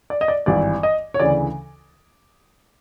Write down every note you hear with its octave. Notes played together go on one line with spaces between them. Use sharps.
D5
D#5
D5
G#1 G2 E3 D5
D#5
C#5
D2 C#3 E3 D5